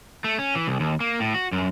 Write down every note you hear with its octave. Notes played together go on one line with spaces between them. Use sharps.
A3
C#4
E3
C2
D#2
A#3
A2
F#4
F#2